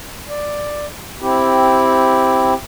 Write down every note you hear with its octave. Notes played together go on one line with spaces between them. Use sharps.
D5
C4 E4 G4